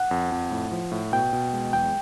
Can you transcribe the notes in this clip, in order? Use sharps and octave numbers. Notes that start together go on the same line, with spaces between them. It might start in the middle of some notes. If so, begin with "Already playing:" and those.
Already playing: F#5
F2
F2
A2
F3
A2
B2 G5
B2
G#3
E2 G5